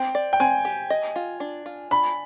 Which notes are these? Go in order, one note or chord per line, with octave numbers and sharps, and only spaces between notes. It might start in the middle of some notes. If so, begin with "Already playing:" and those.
Already playing: C4 G5
D5
G5
C4 G#5
G4
D#5
F4
D4
F4
D4 B5